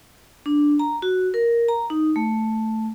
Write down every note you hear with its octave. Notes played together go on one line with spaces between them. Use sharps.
D4
A#5
F#4
A#4
A#5
D#4
A3